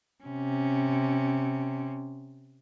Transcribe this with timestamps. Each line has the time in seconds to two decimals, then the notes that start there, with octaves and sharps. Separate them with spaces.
0.24 C3 C#4